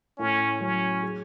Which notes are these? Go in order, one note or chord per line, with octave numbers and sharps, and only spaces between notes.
A2 C#4
F#3 C#4
G#4